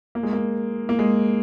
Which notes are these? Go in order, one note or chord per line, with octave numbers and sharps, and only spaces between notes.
A#3
G#3
A#3
A#3
G#3